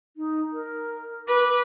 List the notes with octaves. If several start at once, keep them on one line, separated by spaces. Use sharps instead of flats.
D#4
A#4
B4 D6